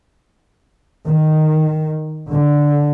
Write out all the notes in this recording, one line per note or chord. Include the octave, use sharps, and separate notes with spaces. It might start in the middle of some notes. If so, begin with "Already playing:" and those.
D#3
D3